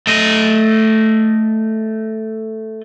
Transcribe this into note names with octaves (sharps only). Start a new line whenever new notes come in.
A3 D#5